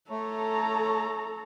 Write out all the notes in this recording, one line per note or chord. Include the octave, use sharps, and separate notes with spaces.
A3 A4 C#5 A#5